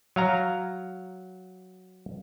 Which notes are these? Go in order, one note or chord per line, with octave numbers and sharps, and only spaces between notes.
F#3 F5 A#5